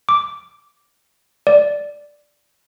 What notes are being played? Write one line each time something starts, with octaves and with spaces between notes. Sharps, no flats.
D6
D5